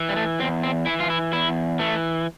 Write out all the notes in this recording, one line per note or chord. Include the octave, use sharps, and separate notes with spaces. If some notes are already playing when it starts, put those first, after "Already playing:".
Already playing: E3
G3
A3
E2 C4
C4
E3 E4
F4
E4
E2 E4
E3 A3